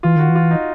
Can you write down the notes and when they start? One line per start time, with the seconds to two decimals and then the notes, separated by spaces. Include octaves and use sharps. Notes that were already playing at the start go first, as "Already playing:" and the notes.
0.03 E3 F4
0.16 D#3 F#4
0.29 E3
0.35 F4
0.51 D#4